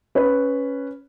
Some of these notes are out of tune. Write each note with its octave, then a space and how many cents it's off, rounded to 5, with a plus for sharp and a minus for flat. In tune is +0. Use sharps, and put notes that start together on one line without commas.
C#4 +0 B4 +0